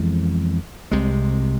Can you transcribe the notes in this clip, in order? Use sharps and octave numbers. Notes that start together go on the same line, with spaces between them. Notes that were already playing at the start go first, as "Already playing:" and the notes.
Already playing: F2 E3 G#3 B3
C2 C3 G#3